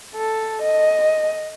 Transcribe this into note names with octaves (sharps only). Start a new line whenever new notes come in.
A4
D#5